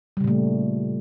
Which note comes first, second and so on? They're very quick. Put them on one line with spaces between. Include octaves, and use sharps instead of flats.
G3 C#3 A#2 A3